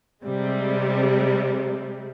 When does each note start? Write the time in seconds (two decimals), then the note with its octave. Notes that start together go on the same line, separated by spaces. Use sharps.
0.23 C3 G3 G#3